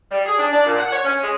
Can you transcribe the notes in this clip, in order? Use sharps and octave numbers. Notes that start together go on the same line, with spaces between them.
G3
G#4
D4
D4
A#2
F#5
C#5
C#4
G#3